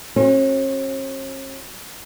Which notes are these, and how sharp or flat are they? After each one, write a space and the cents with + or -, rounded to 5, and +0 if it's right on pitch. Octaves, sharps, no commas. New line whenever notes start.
C#4 -45 F#4 +0